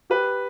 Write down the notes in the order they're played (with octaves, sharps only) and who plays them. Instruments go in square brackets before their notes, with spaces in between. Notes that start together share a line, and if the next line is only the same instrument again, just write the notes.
[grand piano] G4 B4